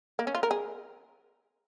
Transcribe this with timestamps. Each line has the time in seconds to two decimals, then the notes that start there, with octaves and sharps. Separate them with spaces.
0.19 A#3
0.27 C#4
0.35 F4
0.43 A#4
0.51 G#4